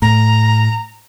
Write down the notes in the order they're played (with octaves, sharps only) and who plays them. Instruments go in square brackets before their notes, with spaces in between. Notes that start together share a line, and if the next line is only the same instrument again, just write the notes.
[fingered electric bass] A2 [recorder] A#5